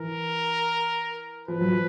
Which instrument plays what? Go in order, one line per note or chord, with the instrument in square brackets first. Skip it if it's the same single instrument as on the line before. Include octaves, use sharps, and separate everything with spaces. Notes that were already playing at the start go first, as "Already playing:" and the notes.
Already playing: [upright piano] E3 [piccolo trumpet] A#4
[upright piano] F3 [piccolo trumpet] B4
[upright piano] F#3
F3